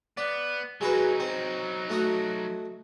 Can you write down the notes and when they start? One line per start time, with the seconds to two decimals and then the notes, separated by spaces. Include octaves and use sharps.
0.17 B3 D5
0.81 F#3 G#3 D#4 F#4 B4
1.20 C4
1.90 A3 F#4 D#5